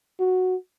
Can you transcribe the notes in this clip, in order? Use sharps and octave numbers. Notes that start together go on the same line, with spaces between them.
F#4